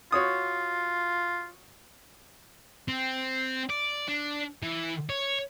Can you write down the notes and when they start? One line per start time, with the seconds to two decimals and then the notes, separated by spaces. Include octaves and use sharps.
0.12 F4 F#4 C#5 D#6
2.88 C4
3.70 D5
4.08 D4
4.63 E3
5.09 C#5